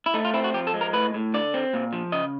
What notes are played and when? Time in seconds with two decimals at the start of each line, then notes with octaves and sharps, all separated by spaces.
0.06 E4
0.14 A3 D#4
0.25 F4
0.34 C4 E4
0.44 F#4
0.54 F3 G4
0.67 A4
0.74 G#3
0.81 A#4
0.93 A2 B4
1.14 A2
1.34 D3 D5
1.54 C4
1.74 A#2
1.93 F3
2.12 C#3 D#5